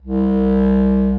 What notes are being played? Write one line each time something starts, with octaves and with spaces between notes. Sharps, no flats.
C2